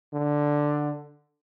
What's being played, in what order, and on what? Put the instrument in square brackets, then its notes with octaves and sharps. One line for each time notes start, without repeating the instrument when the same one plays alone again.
[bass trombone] D3